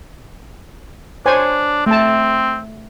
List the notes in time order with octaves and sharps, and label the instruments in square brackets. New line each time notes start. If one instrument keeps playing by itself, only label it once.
[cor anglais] D4 [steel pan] C5 C#5 G#5
[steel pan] A3 A5 [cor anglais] C4